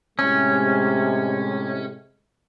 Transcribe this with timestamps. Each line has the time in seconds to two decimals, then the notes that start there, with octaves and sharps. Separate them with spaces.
0.19 A2 C3 G#3 C#4